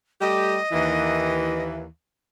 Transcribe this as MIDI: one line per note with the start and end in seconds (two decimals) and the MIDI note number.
0.21 0.57 55
0.21 0.57 57
0.21 0.57 67
0.21 1.63 75
0.72 1.84 39
0.72 1.84 52